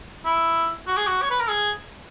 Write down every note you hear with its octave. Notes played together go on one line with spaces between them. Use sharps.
E4
F#4
G#4
F#4
C#5
B4
A#4
G#4